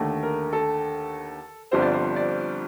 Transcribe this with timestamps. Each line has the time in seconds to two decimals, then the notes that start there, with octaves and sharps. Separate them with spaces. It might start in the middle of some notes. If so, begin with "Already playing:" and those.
Already playing: D#2 D3 A3
0.23 A#4
0.53 A4
1.71 G1 G2 F3 C4 C5
1.82 D5
1.93 C5
2.16 D5